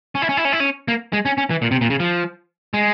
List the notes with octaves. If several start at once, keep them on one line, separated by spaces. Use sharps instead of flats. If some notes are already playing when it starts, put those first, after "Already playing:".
C#4
E4
C#4
E4
C#4
E4
C#4
A#3
G#3
C#4
C#4
E3
A#2
C3
A#2
C#3
F3
G#3